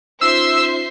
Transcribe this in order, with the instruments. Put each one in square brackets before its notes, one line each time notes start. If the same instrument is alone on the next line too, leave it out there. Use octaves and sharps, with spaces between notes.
[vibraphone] C#4 D#4 F4 [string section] C5 E5 [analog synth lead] E6 [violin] C7